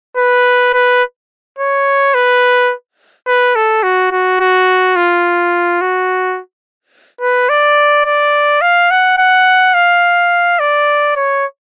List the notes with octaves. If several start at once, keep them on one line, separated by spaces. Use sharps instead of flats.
B4
B4
C#5
B4
B4
A4
F#4
F#4
F#4
F4
F#4
B4
D5
D5
F5
F#5
F#5
F5
D5
C#5